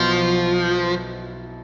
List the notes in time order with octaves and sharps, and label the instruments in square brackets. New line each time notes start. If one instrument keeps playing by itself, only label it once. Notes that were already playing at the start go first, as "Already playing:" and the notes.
Already playing: [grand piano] B1 B2 B3 E4 [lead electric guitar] F3